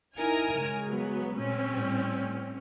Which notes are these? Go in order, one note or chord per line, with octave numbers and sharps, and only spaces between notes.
D#4 E4 A#4 G#5 F6
C#3 G#3
F#3 B3
A#2 C4 C#4
A2 G3